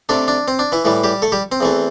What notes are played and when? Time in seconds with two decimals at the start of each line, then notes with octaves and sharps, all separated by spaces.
0.09 C3 A3 D4
0.28 D4
0.48 C4
0.59 D4
0.72 E3 E4
0.85 A2 E3 G3
1.04 G3 G4
1.22 A3 A4
1.32 G3 G4
1.52 C4
1.60 E2 E3 A3